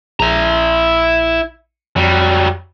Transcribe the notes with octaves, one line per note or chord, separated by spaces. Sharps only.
A#1 E4 A#5
F2 F#3 G3